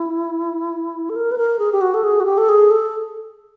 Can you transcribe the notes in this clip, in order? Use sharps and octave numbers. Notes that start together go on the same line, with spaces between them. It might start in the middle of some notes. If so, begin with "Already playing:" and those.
Already playing: E4
A4
A#4
B4
A#4
G#4
G4
F#4
A4
G#4
F#4
G4
A4
G#4
A4